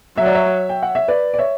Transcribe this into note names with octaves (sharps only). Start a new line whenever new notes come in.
F#3 E5
D5
C#5 E5
G5
F#5
E5
B4 D5
D5
C#5 E5